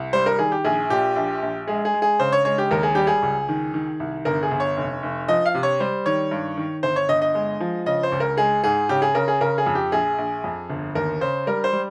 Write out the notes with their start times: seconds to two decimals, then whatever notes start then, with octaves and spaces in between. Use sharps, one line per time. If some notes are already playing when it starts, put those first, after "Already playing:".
Already playing: C2
0.13 G3 C5
0.26 A#4
0.39 D#3 G#4
0.52 G4
0.65 A#1 G#4
0.90 A#2 G4
1.16 A#1
1.42 A#1
1.68 G#3 G#4
1.85 G#4
1.94 G#3
2.02 G#4
2.19 C#3 C5
2.32 C#5
2.45 G#3 C#5
2.58 G4
2.71 D#2 A#4
2.83 G#4
2.95 G3 G4
3.07 G#4
3.22 C#2
3.49 D#3
3.74 D#3
4.00 C2
4.25 G1 A#4
4.43 G#4
4.51 G1
4.60 C#5
4.77 F1
5.03 F1
5.28 F3 D#5
5.46 F5
5.55 C3
5.63 C#5
5.80 G3 C5
6.06 D#3 C#5
6.31 G2
6.57 D#3
6.83 G1 C5
6.96 C#5
7.09 G1 D#5
7.22 D#5
7.35 G#3
7.61 F3
7.86 C#3 D#5
8.03 C5
8.12 C#2
8.20 A#4
8.37 G#3 G#4
8.64 G#2 G#4
8.89 C#3 G4
9.02 G#4
9.15 C#3 A#4
9.28 G#4
9.41 C#3 A#4
9.58 G#4
9.66 F2
9.75 G4
9.92 A#1 G#4
10.18 A#1
10.44 F2
10.70 G1
10.95 D#2 A#4
11.21 C#3 C5
11.47 G3 A#4
11.64 C5
11.73 G3